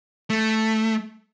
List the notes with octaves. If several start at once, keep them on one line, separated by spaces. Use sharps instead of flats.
A3